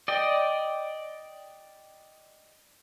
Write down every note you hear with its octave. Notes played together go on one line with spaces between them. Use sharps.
D5 D#5 G5